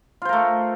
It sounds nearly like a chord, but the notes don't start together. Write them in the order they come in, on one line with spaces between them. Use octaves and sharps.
F4 C5 A#4 A3